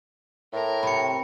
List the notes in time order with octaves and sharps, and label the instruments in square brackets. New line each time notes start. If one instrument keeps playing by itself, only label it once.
[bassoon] A2 [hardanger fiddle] A#4
[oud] C3 [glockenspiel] B5 C#7